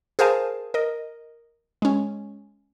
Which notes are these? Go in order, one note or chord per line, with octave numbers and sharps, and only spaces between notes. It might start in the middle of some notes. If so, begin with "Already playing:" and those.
G#4 A#4 C5 F5 G#5 A5
A#4 D#5
G#3 C#4